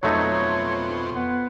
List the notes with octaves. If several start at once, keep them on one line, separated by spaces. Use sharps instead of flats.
F2 B2 F#3 A3 C4 D#4 C#5
B3